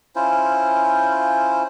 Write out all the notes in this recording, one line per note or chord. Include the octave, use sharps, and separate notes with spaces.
C#4 E4 F4 C5